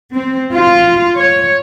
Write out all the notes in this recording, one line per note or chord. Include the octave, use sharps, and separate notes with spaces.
C4
F4
C#5